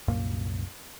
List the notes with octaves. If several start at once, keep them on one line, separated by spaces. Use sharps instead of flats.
C2 F#2 A#2 A#3